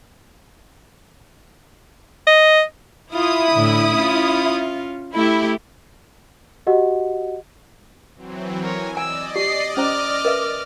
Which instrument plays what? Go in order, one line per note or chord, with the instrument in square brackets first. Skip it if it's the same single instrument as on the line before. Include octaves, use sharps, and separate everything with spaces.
[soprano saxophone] D#5
[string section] E4 D#6 [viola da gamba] F4
[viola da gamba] A2 D3
C#4 F4
[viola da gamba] A3 G4 [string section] E4
[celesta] F#4 G4 D#5 F#5
[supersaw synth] E3 F#3 C4
[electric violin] A#4 C#5 [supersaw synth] G#5
[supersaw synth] D5 D#5 [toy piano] G#5 [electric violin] E6
[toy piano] G4 [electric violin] C7
[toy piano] C#4 C5 A#5 [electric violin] D6 F6
[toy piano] A#4 B4 E5